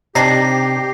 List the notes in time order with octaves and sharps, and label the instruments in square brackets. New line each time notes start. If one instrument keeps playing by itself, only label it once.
[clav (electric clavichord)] C3 [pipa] D4 D#4 [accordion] G4 [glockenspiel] A#6 C7